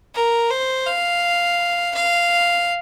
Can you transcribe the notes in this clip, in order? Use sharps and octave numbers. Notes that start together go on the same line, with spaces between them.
A#4
C5
F5
F5